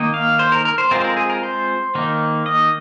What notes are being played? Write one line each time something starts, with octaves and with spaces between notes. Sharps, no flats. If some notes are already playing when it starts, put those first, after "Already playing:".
Already playing: D#3 A#3 D#4
F5
C5
A#4
A#4
C5
G#3 C4 F4 A#4
C5
A#4
G#4
A#4
C5
D#3 A#3 D#4
D#5